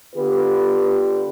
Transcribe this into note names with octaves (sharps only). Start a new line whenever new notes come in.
D3 B3 F4 G4 B4